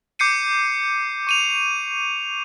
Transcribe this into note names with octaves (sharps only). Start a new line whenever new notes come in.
D6 G6 C7 C#7 D#7
C#6 D#7 F7